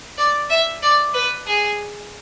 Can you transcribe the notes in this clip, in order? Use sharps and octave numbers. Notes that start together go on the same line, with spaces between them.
D5
E5
D5
B4
G#4